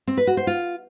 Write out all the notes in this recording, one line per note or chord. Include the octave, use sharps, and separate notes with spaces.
C4
B4
F#4
C5
F4